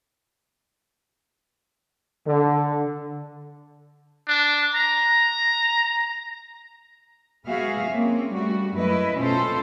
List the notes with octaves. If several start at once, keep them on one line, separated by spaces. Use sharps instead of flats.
D3
D4
A#5
G#3 B3 F#4 G#4 E5 F5
A#3 C4 C#4
G3 A3 F#4
F#2 A3 E4 B4 D#5
B2 C#4 F4 A4 C5